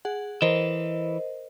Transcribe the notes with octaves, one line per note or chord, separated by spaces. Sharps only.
G#4 F#5
E3 A#4 C5 D#5